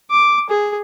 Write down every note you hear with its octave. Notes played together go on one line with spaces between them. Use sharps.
D6
G#4